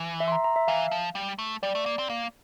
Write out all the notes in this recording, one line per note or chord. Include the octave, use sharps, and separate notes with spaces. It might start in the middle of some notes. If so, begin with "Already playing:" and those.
Already playing: E3
E5
C6
A#5
A#5
E5
E3 F5
F3
G3
A3
G3 D5
A3
A#3
C4
A#3